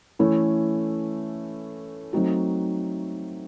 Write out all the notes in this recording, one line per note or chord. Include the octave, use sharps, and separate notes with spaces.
E3 A3 C#4 E4 A4
F#3 A3 C4 D#4 F#4